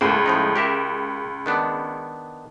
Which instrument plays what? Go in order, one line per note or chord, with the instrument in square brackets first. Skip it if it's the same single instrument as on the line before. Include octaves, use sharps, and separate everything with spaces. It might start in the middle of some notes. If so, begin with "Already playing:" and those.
[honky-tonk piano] C#2 [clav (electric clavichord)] A2 A#3 C5
[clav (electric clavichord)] A2 F3 D#4
G4 A#4 E5
D#3 B3 D4